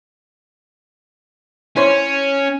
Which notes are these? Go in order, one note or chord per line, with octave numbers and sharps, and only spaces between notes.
C#4 E4 C5 C#5